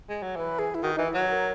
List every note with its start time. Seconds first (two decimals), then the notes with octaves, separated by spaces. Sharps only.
0.09 G#3
0.22 F#3
0.36 E3 B4
0.59 G#4
0.75 E4
0.83 D#3 F#4
0.95 E3 D#4
1.07 E4
1.14 F#3 F#4
1.29 A#4